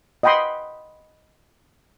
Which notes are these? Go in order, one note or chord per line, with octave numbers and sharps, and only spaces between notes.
D#5 F#5 G5 B5 C6 D#6